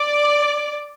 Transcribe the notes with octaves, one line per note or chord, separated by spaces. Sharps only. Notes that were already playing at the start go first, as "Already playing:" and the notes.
Already playing: D5